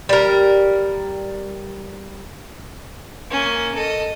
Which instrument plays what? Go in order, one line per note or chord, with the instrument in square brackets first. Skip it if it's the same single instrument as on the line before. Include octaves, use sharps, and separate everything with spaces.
[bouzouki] G3 A#4
[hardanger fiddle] A#3 C#4
A4 D#5